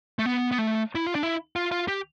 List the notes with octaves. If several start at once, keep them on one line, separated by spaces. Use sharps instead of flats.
A3
B3
B3
A3
E4
F4
D4
E4
F4
F4
G4